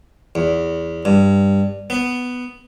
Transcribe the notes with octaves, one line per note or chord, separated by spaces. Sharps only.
E2
G2
B3